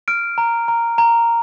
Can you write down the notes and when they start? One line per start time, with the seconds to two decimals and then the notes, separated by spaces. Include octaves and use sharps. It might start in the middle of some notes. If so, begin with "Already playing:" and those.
0.08 F6 D7
0.38 A#5
0.68 A#5
0.98 A#5